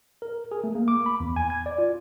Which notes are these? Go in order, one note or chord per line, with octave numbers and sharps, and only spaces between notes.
A#4
G#4
A3
A#3
D6
B5
E2
G#5
G#6
D5
F4